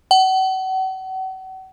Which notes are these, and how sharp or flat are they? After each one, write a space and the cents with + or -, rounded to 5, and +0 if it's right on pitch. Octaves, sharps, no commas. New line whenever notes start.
F#5 +40